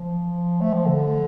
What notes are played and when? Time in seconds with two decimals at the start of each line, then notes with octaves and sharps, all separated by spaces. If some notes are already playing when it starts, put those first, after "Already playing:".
Already playing: F3
0.61 A3
0.73 F3
0.85 D3